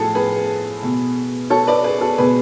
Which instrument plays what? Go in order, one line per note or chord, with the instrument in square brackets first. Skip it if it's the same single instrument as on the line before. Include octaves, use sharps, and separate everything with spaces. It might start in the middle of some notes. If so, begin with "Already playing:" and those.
Already playing: [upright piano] A2 F3 G#4 A4
G#4 B4
B2
A4 C#5
B4 D5
G#4 B4
A4
B2 G#4 B4